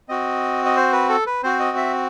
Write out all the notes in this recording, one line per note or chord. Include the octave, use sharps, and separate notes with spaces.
C4 F#4 D#5
D#5
C5
B4
A4
B4
C4 F#4 C5
D#5
E5